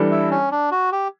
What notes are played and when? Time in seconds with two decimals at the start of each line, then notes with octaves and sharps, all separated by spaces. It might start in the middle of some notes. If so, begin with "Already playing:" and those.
Already playing: E3 G3 D4 A4
0.11 E4
0.31 C#4
0.52 D4
0.72 F#4
0.92 G4